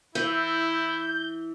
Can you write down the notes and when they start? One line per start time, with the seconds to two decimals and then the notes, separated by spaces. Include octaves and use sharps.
0.15 E3 E4 G6